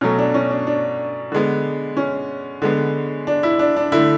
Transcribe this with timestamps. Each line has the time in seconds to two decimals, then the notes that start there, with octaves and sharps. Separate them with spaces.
0.01 B2 F#3 A3 C#4
0.19 D4
0.34 C#4
0.51 D4
0.67 D4
1.32 D3 G#3 B3
1.97 C#4
2.62 D3 G#3 B3
3.27 D4
3.43 E4
3.59 D4
3.77 D4
3.92 D3 A3 E4